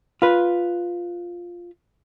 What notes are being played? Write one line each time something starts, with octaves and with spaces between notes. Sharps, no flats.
F4 B4